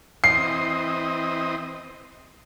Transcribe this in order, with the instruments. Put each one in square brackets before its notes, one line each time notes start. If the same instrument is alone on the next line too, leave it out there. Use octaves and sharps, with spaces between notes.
[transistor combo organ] E3 C4 D#5 [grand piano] C7